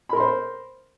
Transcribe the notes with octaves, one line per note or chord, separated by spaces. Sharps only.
A#4 C5 B5 C6